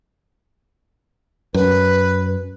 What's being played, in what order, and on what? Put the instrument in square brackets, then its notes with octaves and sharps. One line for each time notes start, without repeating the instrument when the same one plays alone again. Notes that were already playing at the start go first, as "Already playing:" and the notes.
[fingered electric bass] F#2 [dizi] B4